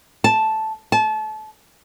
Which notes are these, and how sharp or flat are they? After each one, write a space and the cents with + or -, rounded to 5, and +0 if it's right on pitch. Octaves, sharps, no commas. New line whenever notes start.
A5 -5
A5 -30